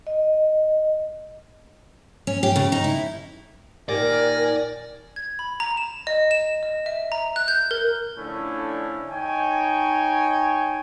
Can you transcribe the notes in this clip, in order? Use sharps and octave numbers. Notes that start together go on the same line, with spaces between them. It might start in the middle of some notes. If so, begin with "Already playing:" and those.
D#5
C#4
G4
C#3
D#4
E4
A#2 D#3 G4 A#4 D5 G#5 A#6
G#6
B5
A#5
E7
D#5
E7
D#5
E5
A#5
F#6
G6
A#4
D3 F3 A3 C#4 D4 E4
D#4 C#5 G5 G#5